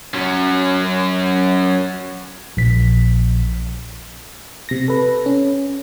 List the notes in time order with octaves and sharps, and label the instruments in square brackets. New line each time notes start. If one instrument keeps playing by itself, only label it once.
[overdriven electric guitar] F#3 C#4
[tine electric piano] A#1 B6
[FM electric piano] C3 A#6
A4 B4
C#4